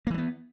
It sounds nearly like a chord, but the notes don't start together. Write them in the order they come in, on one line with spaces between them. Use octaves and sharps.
A#3 E3 G3 B3